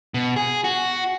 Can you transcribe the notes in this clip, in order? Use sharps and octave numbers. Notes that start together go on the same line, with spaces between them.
B2
G#4
F#4